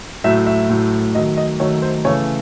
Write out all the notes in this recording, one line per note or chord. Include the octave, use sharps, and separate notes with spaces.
A2 F#3 A3 E5
E5
A2 F#3 A3
D#3 F#3 A3 D#5
D#5
D#3 F#3 A3 C#5
C5
C#3 E3 A3 C#5